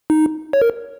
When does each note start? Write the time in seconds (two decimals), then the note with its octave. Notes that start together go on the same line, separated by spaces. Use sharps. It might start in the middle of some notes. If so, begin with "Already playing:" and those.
0.10 D#4
0.53 C#5
0.62 A#4